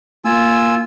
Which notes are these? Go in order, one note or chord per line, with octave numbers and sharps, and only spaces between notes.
A#3 F4 G#5 E6